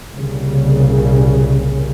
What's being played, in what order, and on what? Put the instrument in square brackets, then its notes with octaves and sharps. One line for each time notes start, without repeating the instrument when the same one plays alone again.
[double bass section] C2 A#2 C#3